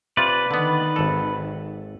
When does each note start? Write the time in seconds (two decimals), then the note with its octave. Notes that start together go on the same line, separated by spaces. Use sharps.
0.17 C3 F4 B4 D5
0.51 D3 D#3 B3
0.96 G#1 A4